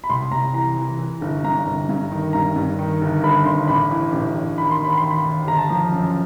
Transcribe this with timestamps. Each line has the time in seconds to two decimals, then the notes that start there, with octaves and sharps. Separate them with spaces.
0.04 B5
0.09 C2 C6
0.31 C2 A#5
0.54 E3 A#5
0.77 E3
0.99 E3
1.21 G1
1.44 G2 A#5
1.66 G1
1.89 G2
2.12 D#3
2.33 G2 A#5
2.56 G2
2.79 D#3
3.01 G1
3.23 G1 B5
3.46 G1 C6
3.68 A1 B5
3.91 E3
4.13 A1
4.35 A1
4.58 D#3 B5
4.71 C6
4.80 D#2 B5
4.97 D#2 C6
5.11 B5
5.25 D#2
5.47 G1 A#5
5.57 A5
5.69 F3 A#5
5.92 F#2